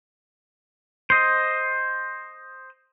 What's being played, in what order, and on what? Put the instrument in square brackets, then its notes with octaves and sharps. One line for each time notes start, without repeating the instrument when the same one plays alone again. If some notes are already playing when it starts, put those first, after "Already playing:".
[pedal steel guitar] C5 D#5